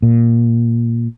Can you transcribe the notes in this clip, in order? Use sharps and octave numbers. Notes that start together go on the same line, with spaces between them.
A#2